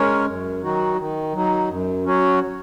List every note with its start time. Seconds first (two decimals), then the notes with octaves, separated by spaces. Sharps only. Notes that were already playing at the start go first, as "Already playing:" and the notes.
Already playing: G#3 C#4 A#4 C#5
0.26 F#2
0.62 D#3 F#3 D#4 F#4
0.97 D#3
1.33 F#3 D#4
1.69 F#2
2.04 F#3 C#4 F#4 C#5